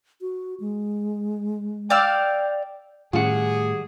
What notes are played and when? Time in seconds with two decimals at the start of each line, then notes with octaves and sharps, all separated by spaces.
0.21 F#4
0.60 G#3
1.90 D5 F5 G5 E6
3.13 A2 D#3 G3 C#4 F4 G#4 F#5